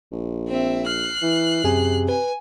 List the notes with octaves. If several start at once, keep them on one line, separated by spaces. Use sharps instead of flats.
A#1
C4 E5
F6 F#6 C7
E3
F#2 C3 G#4 G#5
B4 G#5